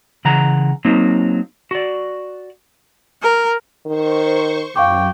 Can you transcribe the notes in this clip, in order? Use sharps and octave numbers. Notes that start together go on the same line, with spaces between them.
C#3 E3 F#5 A#5
F#3 A#3 C4 D#4
F#4 D5
A#4
D#3 C5 C#6
F#2 F5 G5 C#6 D6